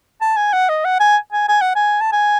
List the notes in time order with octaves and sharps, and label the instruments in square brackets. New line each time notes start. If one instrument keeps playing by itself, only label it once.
[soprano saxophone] A5
G#5
F#5
D#5
F#5
G#5
G#5
G#5
F#5
G#5
A5
G#5